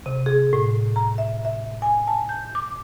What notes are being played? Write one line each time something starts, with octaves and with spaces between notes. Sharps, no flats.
C3
G#4
A2
A#5
E5
E5
G#5
A5
G6
D6